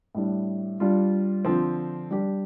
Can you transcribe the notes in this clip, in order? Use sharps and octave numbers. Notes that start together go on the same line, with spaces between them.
A2 G3 D4
G3 D4 F4
D3 F3 C4
G3 D4 G4